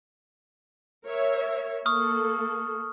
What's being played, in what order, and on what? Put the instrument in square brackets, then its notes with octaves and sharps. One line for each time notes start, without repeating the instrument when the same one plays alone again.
[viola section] A#4 C#5 E5
[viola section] A#3 A4 [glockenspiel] C#6 D#6 F6